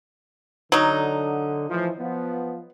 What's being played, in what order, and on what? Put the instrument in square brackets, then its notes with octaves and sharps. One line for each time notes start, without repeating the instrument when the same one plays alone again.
[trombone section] D3 [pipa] F#3 D#4
[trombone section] A2 E3 F3
F3 B3